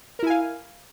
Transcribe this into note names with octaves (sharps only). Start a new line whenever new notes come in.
E4 A#4 F5 G#5